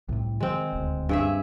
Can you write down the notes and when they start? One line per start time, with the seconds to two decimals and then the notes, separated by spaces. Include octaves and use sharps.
0.09 C2 A2 C3
0.40 D#3 G#3 C4
0.73 D#1 D2
1.09 G2 G#4 E5